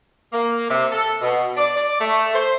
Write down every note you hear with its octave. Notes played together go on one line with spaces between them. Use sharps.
A#3
C3
A4
B2
D5
D5
A3
C5